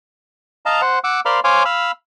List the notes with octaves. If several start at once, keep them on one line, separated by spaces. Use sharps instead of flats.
D#5 F5 A5 A#5
C5 F#5
F#5 D6 E6
A#4 C5 D5 F5 B5 C6
C5 C#5 F5 G#5 C6 D6
F5 B5 E6